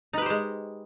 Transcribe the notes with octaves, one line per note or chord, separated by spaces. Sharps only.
G#3 D#4 G4 B4 C5